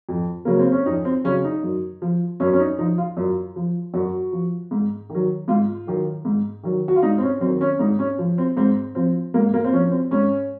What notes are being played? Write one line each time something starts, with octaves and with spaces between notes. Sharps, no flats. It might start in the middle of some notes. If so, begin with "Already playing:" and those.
F2
C#3 F#3 A#3
C4
C#4
F2 D#4
C4
C#3 F#3 C#4
D#4
F#2
F3
F#2 C#4
C#4
D#4
F3 D#4
F4
F#2
F3
F#2 F#4
F3
G#2
D#3
F#3
G#2 F4
D#3 F#3
G#2
D#3 F#3
F#4
F4
G#2 D#4
C4
C#4
F#3 C4
D#3
C#4
G#2 D#4
C#4
F3
C4
G#2 C4
F3 C4
G#2 A#3
A#3
C4
F3 C#4
C4
G#2 C#4